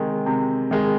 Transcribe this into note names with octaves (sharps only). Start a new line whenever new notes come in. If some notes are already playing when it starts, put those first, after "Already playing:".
Already playing: C3 D#3 G#3
C3
D#3 G#3